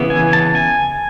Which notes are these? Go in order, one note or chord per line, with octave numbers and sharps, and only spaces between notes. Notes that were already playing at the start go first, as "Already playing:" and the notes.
Already playing: C#3 E3 B3
G#5
A5
G#5